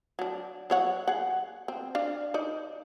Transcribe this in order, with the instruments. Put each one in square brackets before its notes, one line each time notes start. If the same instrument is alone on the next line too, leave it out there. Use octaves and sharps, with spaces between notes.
[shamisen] F#3 D4
F#3 C#5 F#5
G#4 F#5
C4
D4 F5
D#4 D5